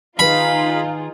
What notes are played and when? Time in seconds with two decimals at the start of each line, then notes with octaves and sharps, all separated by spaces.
0.19 D#3 D#4 F4 G#4 B4 F5 B5